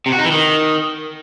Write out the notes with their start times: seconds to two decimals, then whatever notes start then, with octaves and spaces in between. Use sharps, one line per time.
0.06 C3
0.12 F#4
0.19 D#4
0.25 E3
0.31 D#3